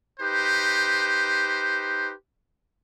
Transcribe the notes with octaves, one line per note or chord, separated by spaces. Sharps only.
D#4 G4 B4 C5